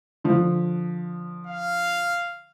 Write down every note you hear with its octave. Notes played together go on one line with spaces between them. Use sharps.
D3 F3
F5